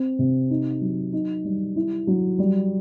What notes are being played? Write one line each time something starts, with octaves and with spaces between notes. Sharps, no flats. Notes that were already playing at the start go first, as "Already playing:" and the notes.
Already playing: C4
C3
D#4
F#3
D#4
G3
E4
F#3
G3